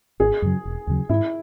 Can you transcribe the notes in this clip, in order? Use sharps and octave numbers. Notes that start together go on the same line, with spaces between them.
G#1 G#4
F#2 C#3 F#3
E1
D#2 C#3 F#3
G#2 E4